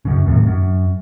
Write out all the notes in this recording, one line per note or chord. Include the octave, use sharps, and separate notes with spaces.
F#2 C#3
D#2 A2 C3
F#2